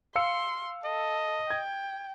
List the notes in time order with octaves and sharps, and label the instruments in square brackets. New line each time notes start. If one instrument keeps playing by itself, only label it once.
[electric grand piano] F5 E6 C#7 [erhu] C6
[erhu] A4 [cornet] D#5
[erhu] G5 [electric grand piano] G#6